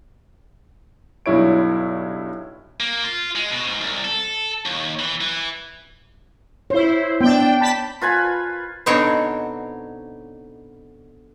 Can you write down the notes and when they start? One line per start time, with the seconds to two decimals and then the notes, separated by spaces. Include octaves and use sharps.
1.26 B1 G2 E4 C#5 D7
2.80 A#3
3.04 F4
3.36 G#3
3.51 B2
3.67 G#2
3.81 C2
4.04 A4
4.66 D#2
4.99 E3
5.21 E3
6.70 E4 C5 C#5
7.21 B3 D4 G5
7.61 A5 B5 B6
8.01 F4 B4 G#5 B5
8.86 B2 D3 B3 C4 D#4 C#5